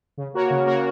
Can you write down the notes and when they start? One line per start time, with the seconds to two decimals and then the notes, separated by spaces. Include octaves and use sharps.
0.17 C#3
0.34 A#3 F#4 A#4 C#5
0.50 C#3
0.66 A#3 F#4 A#4 C#5